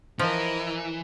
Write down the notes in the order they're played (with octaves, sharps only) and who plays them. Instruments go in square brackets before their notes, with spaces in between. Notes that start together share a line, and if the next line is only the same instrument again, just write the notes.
[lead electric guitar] E3 [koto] F3 [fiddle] A#4 D#5